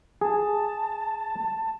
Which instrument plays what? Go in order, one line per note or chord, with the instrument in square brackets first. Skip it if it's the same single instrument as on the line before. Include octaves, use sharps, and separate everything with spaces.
[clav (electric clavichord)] G#4 [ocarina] A5